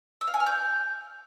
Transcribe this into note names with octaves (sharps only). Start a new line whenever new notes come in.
E6
F5
G#5
F6
G6